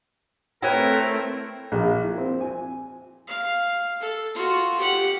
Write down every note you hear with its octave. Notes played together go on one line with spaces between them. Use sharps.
A3 C4 E4 A#4 B4 C#5 G5
A#1
E4
C4
G#5
F5
A4
F4 F#4
G4 F#5